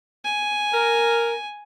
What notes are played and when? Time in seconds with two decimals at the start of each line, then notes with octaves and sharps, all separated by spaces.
0.25 G#5
0.73 A#4